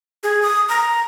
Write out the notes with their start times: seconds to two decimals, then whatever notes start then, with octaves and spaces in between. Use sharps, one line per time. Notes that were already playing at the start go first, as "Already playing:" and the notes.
0.23 G#4
0.42 D#6
0.69 A#5